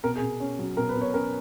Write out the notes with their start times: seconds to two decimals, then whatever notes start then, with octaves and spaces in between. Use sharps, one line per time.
0.04 B2 A#4
0.16 G#4
0.22 B2
0.40 C#4
0.59 F#3
0.77 B2 A#4
0.89 B4
0.95 B2
1.01 C#5
1.13 C#4 A#4